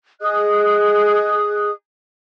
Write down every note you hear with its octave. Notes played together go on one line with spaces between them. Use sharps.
G#4 D#5 D#6 F#6